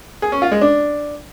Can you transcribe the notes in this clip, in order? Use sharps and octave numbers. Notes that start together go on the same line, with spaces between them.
G#4
C#4
F4
G#3
D4